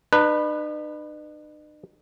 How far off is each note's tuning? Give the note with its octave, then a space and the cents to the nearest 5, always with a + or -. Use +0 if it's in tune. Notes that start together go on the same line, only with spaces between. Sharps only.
D#4 -45 B4 +0